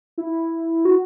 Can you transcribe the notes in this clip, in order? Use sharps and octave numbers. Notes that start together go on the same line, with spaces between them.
E4
F#4